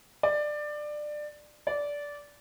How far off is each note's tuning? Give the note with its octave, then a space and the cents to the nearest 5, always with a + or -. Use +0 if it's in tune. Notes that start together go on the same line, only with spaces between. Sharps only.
D5 +20
D5 -15